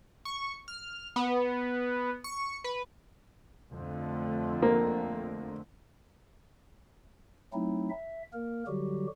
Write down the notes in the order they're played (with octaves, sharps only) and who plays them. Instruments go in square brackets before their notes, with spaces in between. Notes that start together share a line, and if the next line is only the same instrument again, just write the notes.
[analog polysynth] C#6
F6
B3
C#6
B4
[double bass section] F2 D3 A3
[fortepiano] A#3
[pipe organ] F#3 A3 C4 D#4 E4
E5
A#3 A#4
D3 F#3 G3 F#4 G4